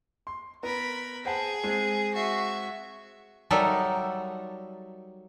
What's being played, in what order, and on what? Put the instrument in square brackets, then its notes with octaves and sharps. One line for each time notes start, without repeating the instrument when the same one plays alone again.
[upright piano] C6
[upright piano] B3 [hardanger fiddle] A#4 B5
[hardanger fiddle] G#4 [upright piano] C5 F#5 A5
[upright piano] G#3 C4
[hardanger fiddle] F#4 E5
[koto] F#3 G3 D#4 A4 A#4 E5